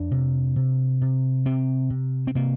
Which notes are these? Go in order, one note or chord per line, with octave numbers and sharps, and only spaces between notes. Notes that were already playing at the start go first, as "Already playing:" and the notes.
Already playing: F2 D4
C3
C3
C3
C3 C4
C3
C4
C3 A#3